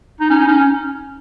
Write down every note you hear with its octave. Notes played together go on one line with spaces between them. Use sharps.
D#4
C#4
D#4
C#4